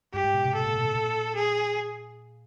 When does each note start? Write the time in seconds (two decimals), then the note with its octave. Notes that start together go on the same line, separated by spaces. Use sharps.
0.14 G2 G4
0.24 G#2
0.34 B2
0.44 C3
0.55 A4
0.64 A#2
0.75 B2
0.85 C3
0.95 A#2
1.35 G#4